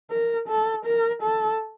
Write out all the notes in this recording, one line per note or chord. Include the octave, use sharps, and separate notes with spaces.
A#4
A4
A#4
A4